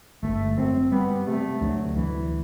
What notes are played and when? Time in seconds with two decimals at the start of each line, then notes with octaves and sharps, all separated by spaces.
0.22 G1 A3
0.57 F#2 C4
0.92 G3 B3
1.27 C3 A3
1.61 D2 F#3
1.96 D2 E3